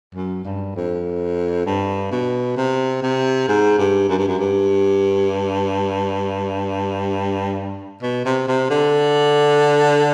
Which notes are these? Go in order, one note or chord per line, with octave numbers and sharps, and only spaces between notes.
F#2
G2
F2
G2
B2
C3
C3
G#2
G2
F#2
G2
F#2
G2
B2
C3
C3
D3